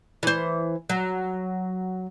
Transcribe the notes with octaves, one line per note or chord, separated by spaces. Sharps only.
E3 C5
F#3